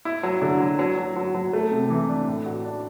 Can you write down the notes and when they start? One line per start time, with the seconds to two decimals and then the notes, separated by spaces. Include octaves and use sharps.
0.05 E4
0.23 F#3
0.42 D3
0.60 F#3
0.79 F#3
0.98 F#3
1.16 F#3
1.35 F#3
1.53 A3
1.72 C3
1.90 E3
2.09 D4
2.27 A2
2.46 F#4
2.65 D4